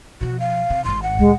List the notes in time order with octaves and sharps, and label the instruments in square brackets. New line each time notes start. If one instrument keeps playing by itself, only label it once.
[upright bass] B2 F3 [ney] F#4
[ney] F5
[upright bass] C3
[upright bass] G#1 G#2 [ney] C6
[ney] F#5
[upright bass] D2 A#2 [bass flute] G#3